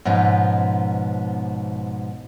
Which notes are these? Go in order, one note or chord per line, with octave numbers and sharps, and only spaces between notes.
G#2 B2 F3 C#4